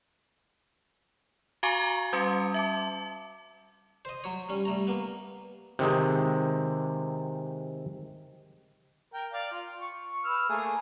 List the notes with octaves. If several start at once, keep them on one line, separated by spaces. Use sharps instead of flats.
F#4 F5 G#5 A#5 C#6 D6
G3 C#4 C6 C#7
E5 A5 D6
C5 D#5
F#3 C#5
G3 C#4
G3 A3 A#5
A#3 B3
C3 D#3 G#3
A#4 G5
D5 F5
F4
C#6
B4 E6 F6
A3 A#3 G#4